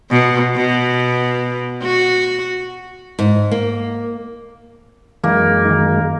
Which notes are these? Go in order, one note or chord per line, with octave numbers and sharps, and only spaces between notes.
B2
B2
F#4
G#2
A#3
F#2 E3 G#3 A#3 D#4
D#3 D#4